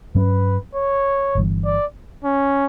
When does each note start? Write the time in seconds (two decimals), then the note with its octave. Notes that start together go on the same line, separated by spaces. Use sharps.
0.15 G2 F#3 C#4 B4
0.75 C#5
1.35 G1 G2 E3
1.65 D5
2.24 C#4